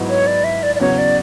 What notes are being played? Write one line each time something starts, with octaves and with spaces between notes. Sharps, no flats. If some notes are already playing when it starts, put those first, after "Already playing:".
Already playing: G#2 F#3 B3 E4
C#5
D5
E5
D5
D5
E2 C#3 F#3 C#5
D5